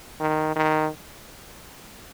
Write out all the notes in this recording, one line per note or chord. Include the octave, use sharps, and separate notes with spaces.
D#3
D#3